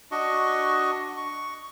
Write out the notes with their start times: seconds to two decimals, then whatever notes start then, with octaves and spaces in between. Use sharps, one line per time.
0.11 D4 F#4 D#5 C#6
1.17 C#6